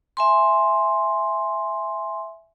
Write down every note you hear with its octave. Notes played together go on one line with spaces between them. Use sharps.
E5 G#5 C6